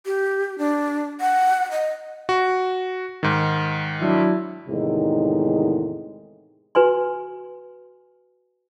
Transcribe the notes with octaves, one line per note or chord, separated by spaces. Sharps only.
G4
D4
F#5
D#5
F#4
G#2 D#3
F#3 D4 E4
E2 A2 C3 D#3 G#3 D#4
F#4 B4 G#5 C6